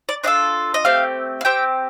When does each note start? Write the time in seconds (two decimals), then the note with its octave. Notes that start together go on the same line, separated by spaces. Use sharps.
0.09 D5
0.24 D4 F4 A4 D#5
0.74 D#5
0.85 A3 C4 G4 F5
1.41 F5
1.45 C4 G4 G5